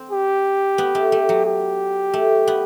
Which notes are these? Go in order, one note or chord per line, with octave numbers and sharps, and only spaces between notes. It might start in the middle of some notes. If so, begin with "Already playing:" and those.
Already playing: C4
G4
B3
A3
A3
F#3
G4
A3
B3